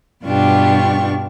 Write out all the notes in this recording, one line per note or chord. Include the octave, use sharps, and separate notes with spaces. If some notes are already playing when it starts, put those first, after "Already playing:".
G2 B2 D4 F4 G4 C#6